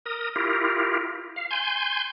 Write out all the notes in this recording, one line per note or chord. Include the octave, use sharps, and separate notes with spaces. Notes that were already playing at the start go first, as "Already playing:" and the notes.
A#4 D#6
E4 F4 G4 A#4
F5
G#5 C6 G6